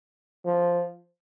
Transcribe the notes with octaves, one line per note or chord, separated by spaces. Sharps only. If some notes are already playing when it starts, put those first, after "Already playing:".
F3